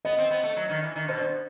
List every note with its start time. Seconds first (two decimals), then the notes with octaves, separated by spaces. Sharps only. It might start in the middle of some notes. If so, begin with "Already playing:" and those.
0.05 B3 D#5
0.18 C4
0.31 B3
0.43 A3
0.56 F#3
0.70 D#3
0.83 E3
0.96 D#3
1.08 B2 C5
1.18 G2